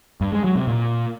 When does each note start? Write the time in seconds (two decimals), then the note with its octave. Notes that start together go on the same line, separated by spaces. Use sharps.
0.21 G2
0.32 G#3
0.44 F#3
0.56 C3
0.67 A#2